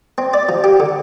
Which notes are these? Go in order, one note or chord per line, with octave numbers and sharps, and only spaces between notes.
C4
D5
F3
G4
D3